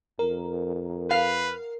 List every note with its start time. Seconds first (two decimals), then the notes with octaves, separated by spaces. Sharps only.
0.19 F2 A#4
1.11 B4 F5